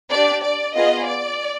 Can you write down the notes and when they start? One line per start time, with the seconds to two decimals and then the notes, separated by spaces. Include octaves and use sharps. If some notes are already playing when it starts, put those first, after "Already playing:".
0.11 D4 G4 D5
0.43 D5
0.75 B3 F4 G#4 D#5
1.07 D5